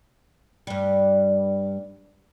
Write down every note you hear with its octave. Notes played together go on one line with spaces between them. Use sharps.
G2 G3